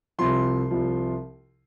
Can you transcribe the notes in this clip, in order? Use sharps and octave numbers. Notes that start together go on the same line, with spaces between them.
C2 C3 F3 C6
C2 C3 F3